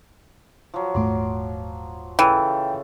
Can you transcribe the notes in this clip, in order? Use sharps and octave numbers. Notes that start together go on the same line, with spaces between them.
F3 F#3
D#1 G#2 A3 C6 D6
C#3 E3 A4 G5